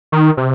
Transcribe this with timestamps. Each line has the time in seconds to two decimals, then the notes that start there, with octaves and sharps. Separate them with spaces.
0.12 D#3
0.37 C3